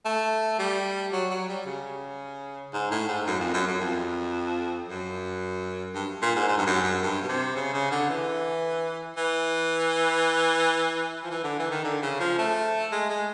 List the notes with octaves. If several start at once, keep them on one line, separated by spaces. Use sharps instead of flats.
A3
G3
F#3
F#3
G3
C#3
G#2
A2
G#2
F#2
F2
F#2
F#2
F2
F#2
G2
A#2
G#2
G#2
G2
F#2
F#2
G2
B2
C3
C#3
C#3
D3
E3
E3
F3
E3
D3
E3
D#3
D3
C#3
F3
A3
G#3
G#3